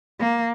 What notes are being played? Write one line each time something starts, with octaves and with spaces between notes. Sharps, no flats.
A#3